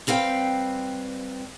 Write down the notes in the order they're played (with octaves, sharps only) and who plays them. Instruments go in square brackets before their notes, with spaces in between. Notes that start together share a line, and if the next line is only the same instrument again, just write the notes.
[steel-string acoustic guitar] G3 C4 B4 F5 G5